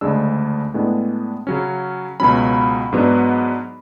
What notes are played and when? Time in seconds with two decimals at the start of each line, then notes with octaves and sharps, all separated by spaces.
0.01 D2 C#3 G#3 D4 E6
0.74 A2 G#3 B3 D4
1.47 C#3 F#3 C#4
2.20 C#2 B2 F#3 C#4 B5
2.93 G#2 F#3 B3 D4